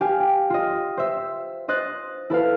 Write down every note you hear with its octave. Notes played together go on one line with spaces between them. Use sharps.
G4 F5 G#5
G5
F4 D#5
C5 E5
C5 D#5 F#6 A6
E4 A4 B4 F5